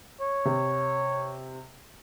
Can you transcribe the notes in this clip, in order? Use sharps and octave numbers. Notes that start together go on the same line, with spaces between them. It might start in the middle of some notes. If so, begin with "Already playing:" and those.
C#5
C3